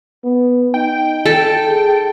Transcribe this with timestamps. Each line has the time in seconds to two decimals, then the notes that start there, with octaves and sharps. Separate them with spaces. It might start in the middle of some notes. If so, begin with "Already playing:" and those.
0.24 B3
0.74 D#4 G5
1.26 A4
1.68 G#4